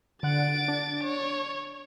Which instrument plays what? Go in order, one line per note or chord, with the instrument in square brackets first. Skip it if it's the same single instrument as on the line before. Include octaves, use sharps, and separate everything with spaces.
[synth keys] D3 F#5 [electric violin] A6 D7
[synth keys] D4
[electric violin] C#5